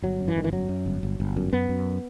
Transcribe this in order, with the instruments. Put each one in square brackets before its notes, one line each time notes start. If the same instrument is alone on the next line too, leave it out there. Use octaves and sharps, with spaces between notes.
[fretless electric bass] G1 F#3
F#2
E3
G1 D#3
E3
F#2 F#3
F#2
G1
G1
G1
F#2
F#2 B3
F#2